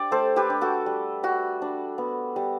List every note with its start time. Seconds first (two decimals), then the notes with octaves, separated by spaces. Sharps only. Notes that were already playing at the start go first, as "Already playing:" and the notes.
Already playing: D4 G4 D5
0.11 A3 A4 C5
0.36 G4 B4
0.50 D4
0.61 F#4 A4
0.86 G3
1.23 G3 F#4
1.62 D4
1.98 B3
2.36 G3